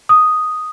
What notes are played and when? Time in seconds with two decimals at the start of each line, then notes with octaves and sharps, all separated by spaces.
0.09 D#6